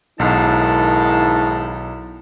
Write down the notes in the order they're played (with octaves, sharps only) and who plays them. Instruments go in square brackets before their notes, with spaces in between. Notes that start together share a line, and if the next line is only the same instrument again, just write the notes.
[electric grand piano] B1 [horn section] G#2 D#3 A5 [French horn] E4